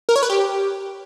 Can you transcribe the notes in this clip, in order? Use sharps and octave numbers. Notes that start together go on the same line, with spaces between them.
A#4
C#5
B4
G4